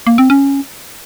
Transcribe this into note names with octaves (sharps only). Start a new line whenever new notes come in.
A#3
C4
C#4